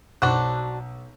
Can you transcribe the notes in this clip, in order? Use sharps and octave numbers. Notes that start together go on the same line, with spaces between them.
B1 D4 F#4 C5 F#6